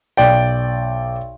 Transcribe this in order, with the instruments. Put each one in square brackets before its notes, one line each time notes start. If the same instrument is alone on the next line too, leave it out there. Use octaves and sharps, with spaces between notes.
[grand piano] B1 D5 G5